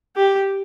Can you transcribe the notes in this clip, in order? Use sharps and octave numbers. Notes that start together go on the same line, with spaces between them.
G4